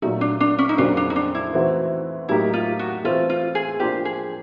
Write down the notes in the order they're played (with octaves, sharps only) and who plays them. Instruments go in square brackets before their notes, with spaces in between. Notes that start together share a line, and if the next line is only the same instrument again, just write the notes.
[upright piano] A#2 F#3 A3 [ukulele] D#4
[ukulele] D4
D4
C#4
D#4
[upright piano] F2 C#3 F#3 A#3 [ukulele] D4
[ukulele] D4
D#4
D4
E4
[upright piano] E3 A3 C4 D#4 F#4
[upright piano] A2 F#3 A#3 D#4 G4 [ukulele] E4
[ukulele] F4
F#4
[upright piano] E3 A3 C4 [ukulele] F4
[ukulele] F4
G#4
[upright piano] F3 A#3 D4 F4 [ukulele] G4
[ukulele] G#4